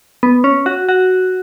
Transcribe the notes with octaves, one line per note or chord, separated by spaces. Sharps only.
B3
C#4
F#4
F#4